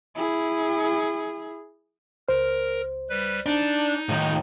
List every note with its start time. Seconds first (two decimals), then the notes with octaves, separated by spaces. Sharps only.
0.15 E4 G#4
2.29 C#2 A#4 C5
3.10 G3 B4
3.46 D4 D#4
4.09 A2 D#3